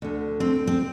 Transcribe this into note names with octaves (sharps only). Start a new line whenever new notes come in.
D2 D3
C4
C4